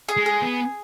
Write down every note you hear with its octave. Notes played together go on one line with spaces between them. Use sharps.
G#4
G#3
G#4
B3